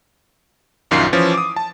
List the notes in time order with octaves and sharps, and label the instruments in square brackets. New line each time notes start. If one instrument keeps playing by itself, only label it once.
[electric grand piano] A#1 F#2 D#3 F4 C7
E3 F3 C#4
D6 D#6
A5